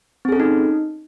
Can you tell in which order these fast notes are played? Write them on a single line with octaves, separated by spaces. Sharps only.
C4 G#4 A4 C#4 D#4